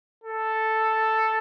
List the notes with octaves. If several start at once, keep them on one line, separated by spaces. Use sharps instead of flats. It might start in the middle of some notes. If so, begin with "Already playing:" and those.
A4